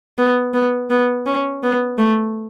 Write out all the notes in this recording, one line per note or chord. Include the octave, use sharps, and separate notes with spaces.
B3
B3
B3
C#4
B3
A3